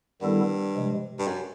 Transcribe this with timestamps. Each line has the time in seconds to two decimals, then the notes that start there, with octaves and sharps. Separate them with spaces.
0.21 G2 D#3 G3 B3 E4 A4
0.75 C3 F3 G#3
1.19 G2
1.27 F#2